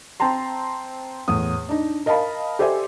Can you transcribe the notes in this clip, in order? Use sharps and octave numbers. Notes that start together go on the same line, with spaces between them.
C4 G5 A5 A#5 C6
E2 A2 D#6
D4 D#4
A#4 D#5 F5 A5 B5
G4 A4 C5 D5 E5 G#5